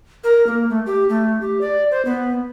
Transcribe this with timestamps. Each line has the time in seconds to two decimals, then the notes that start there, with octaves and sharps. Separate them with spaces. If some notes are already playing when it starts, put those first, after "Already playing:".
0.24 A#4
0.47 A#3
0.69 A3
0.86 G4
1.09 A3
1.41 G4
1.61 D5
1.91 C5
2.05 B3